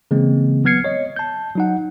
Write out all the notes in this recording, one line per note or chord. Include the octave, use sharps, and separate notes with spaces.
C#3 E3 G#3 A#3 C4
F#3 B3 F6 G#6 C7 C#7
C#5 D#5
A5 G6
F#3 D#4 F#5